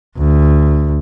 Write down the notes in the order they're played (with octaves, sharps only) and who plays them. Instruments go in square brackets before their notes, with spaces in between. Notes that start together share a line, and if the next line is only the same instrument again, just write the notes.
[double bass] D2